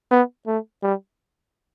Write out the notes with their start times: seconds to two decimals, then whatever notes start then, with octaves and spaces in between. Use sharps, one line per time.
0.11 B3
0.47 A3
0.83 G3